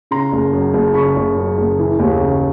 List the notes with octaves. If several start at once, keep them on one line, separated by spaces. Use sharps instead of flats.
C#3 A#5 C6
F#1
F#2
F#1
C#3 B5 C#6
F#1
F#2
F#1
E3
D#2
C#3